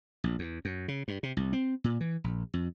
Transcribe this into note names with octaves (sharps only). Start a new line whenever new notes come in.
A#1
E2
F#2
C#3
G2
C3
C2
C4
A#2
E3
A#1
F2